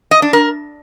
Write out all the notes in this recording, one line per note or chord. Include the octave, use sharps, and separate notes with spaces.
D#5
D4
A#4